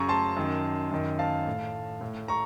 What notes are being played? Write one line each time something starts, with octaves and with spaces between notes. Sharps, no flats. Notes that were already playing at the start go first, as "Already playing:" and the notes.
Already playing: F#2 C#3 A#5 C#6
A5 C6
F#2 D#3
F#2 D#3
F5 A5
A2
A2
A#5 C#6